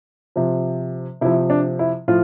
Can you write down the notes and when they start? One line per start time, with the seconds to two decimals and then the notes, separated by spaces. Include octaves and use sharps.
0.36 C3 F3
1.21 C3 F3 E4
1.50 D4
1.79 E4
2.08 A2 F3 F4